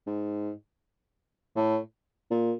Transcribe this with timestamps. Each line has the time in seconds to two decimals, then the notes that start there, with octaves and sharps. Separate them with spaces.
0.07 G#2
1.56 A2
2.30 A#2